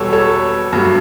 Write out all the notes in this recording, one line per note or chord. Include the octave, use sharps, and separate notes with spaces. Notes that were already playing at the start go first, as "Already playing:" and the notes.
Already playing: E2 B2 G3 A4 C#5
A4 C#5
G2 F#3 A3